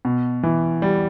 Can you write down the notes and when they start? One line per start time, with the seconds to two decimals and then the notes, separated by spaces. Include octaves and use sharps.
0.05 B2
0.43 E3
0.82 G3